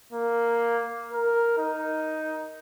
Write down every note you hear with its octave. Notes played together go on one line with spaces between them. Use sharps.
A#3
A#4
D#4